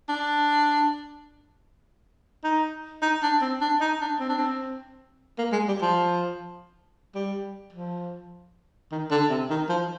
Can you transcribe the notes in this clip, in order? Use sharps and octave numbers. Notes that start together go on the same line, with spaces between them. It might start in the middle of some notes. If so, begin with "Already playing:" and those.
D4
D#4
D#4
D4
C4
D4
D#4
D4
C4
D4
C4
A#3
G#3
G3
F3
G3
F3
D#3
D3
C3
D#3
F3